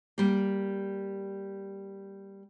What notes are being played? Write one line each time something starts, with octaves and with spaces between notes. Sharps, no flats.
G3 A#3